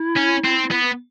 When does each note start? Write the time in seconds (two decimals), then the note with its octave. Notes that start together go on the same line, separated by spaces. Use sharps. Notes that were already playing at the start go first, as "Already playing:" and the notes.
Already playing: E4
0.17 C#4
0.45 C4
0.71 B3